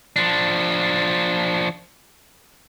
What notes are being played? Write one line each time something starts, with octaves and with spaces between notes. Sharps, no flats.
F3 D4